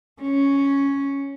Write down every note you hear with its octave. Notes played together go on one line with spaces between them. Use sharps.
C#4